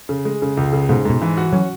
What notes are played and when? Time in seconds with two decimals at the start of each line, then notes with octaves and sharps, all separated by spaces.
0.09 C#3
0.25 G#3
0.42 C#3
0.57 C#2
0.73 C#3
0.89 G#2 B2
1.05 G#2 B2
1.22 E3
1.37 F#4
1.52 F#3 C#4